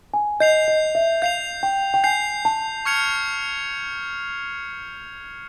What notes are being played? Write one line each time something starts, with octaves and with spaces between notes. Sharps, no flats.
G#5
D#5 G6 C7 F7
D#5
E5
F5 G6 C7 F7
G5
G5
G#5 G6 C7 F7
A5
C#6 F6 G#6 C#7 F7